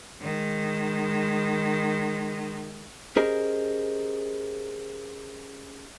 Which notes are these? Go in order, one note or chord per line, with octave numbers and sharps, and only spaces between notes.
D#3 G#3
C#4 G4 G#4 A#4 C5 D#5